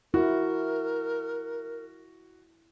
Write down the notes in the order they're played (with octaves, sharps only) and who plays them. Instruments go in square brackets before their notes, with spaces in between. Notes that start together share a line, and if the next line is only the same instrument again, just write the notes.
[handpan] E4 [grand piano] F#4 [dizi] A#4